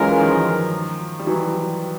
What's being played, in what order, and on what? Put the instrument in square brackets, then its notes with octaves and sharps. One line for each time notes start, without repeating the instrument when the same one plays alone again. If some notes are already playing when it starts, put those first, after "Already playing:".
Already playing: [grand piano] E3 F#3 [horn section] G#3 C#4 F4 A#4
[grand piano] D#3 F3
G3
E3 F#3